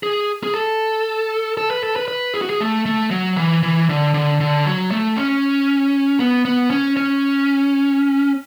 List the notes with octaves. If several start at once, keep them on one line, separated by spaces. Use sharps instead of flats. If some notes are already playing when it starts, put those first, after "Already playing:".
G#4
G#4
A4
A4
B4
A4
B4
B4
G#4
F#4
G#4
A3
A3
F#3
E3
E3
D3
D3
D3
F#3
A3
C#4
B3
B3
C#4
C#4